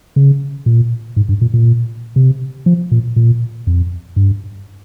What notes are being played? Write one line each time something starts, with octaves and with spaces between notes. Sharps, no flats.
C#3
A#2
G#2
G2
A#2
A#2
C3
F3
A#2
A#2
F2
G2